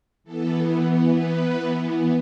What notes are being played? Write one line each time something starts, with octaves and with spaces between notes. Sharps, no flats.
E3 B3 A4
B4